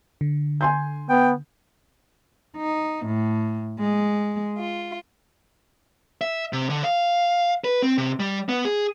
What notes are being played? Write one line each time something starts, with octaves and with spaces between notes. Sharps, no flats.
D3
G#5 C6 G6
B3 G5
D#4
A2
G#3
F4
E5
C3
D3
F5
B4
C4
C3
G3
B3
G#4